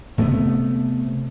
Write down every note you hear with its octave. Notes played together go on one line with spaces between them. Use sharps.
C3 A3 B3